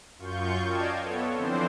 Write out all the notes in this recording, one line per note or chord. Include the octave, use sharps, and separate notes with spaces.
F#2 F4 C#6 G6
D5 D#5 F5 G5 A5 G#6
B3 A4 C#5
D3 E3 F3 C4 D4 C5